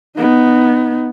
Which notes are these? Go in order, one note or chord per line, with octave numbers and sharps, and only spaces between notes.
B3 D#4